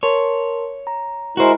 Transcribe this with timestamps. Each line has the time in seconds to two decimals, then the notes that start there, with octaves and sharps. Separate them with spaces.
0.03 A#4 C#5 A5 C6
0.87 A#5
1.37 G#3 E4 F#4 A#4 C5